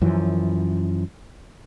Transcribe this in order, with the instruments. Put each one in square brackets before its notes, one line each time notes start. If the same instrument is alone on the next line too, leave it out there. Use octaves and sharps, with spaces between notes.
[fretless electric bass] F#2 E3 F3